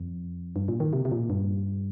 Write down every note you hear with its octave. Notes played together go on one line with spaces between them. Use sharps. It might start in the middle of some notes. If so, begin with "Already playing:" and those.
Already playing: F2
G2
A#2
D#3
C3
C3
A#2
G2